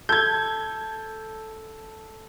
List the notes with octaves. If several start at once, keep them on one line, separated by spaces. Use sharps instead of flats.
A4 G6 G#6